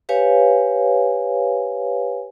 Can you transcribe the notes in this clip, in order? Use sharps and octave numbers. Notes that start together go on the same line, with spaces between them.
G4 B4 C#5 F5 G#5